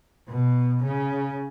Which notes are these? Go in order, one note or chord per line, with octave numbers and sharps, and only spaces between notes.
B2
C#3